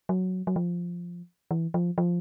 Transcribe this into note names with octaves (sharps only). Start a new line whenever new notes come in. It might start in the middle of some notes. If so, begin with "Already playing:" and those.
F#3
F#3
F3
E3
F3
F3